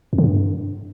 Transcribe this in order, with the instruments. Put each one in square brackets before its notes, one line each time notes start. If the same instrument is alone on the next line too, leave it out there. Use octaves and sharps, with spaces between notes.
[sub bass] F2
D3
G2